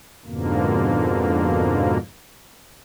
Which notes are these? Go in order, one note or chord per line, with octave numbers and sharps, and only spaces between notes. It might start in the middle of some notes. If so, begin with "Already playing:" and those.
F2 G#2 B2 D3 A#3